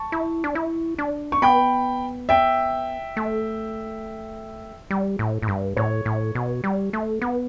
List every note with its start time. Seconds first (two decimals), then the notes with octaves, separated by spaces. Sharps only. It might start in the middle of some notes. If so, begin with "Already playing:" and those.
Already playing: A5 C#6
0.12 E4
0.44 D4
0.55 E4
0.98 D4
1.32 C#6
1.42 B3 G5 B5
2.29 E5 G5
3.17 A3
4.90 G3
5.19 A2
5.42 A2
5.48 G2
5.77 A2 C#5
6.05 A2
6.35 B2
6.64 G3
6.93 A3
7.22 B3